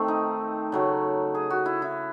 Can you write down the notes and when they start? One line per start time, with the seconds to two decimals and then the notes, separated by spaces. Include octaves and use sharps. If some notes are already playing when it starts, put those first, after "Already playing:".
Already playing: D#3 A3 C4
0.08 D#4
0.72 C#3 F#3 A3
1.35 G#4
1.50 F#4
1.66 E4
1.82 E4